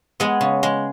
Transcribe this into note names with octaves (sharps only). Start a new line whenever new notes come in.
G#3 B3 G#4
C#3
G#3